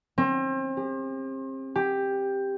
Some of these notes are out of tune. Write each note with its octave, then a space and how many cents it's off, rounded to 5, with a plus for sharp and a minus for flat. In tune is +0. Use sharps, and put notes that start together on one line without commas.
C4 +35
G4 +45
G4 +10